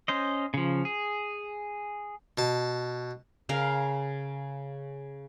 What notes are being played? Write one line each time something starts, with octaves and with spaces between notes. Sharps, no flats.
C#4 C5 D#5
C#3 F3
G#4
B2 A5
C#3 A#4 F5